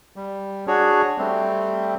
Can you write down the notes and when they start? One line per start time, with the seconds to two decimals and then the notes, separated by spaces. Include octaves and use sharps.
0.16 G3
0.67 D4 F#4 G#4 C#5
1.18 G3 A3 C4